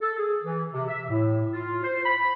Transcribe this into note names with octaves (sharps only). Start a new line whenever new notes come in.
A4
G#4
E3
C3
E5
A2
F4
C5
B5